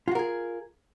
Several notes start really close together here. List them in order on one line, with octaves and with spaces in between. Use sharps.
F4 F#4 A#4 G#4